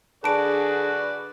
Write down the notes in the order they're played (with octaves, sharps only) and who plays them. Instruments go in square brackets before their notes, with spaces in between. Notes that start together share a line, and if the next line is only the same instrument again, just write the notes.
[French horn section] D3 D4 G#4 [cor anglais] F#4 [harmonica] B4 D5 [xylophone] A5 D7